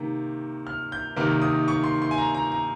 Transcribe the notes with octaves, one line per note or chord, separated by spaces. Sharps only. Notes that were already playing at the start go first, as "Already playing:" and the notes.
Already playing: C3 D#3 A#3
F6
G6
C3 D#3 A#3 F6
D#6
C#6
C6
C6
G#5
A#5
A#5
A#5